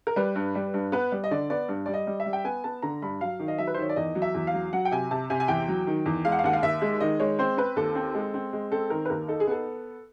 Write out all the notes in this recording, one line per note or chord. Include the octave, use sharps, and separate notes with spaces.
A#4
G3 B4
G2
G3
G2
B3 B4
G3
D#5
D3 D5
B3 D5
G2
G3 D5
D#5
G3
E5
G3
G5
B3 G#5
B3 A5
D3 A#5
G2 B5
F#3 F5
D#3
D#5
F#3 E5
B4
C5
D#3 C#5
D5
E2 D#5
F#3
E5
E2
F5
F#3
F#3 F#5
G5
C3 G#5
C3 A5
C3 G#5
G#5
E2 G5
F#3
D#3
E2
G#3 F5
F#5
F5
D#2 F#5
F5
D#2 E5
G#3
D#3 D#5
G#3 C#5
C4 C5
C4 B4
D#2 A4
C4
G#3
C4
G#3
C4 A4
D#3 A#4
B4
D#2 A#4
D#4 A4
G#4
B3 A4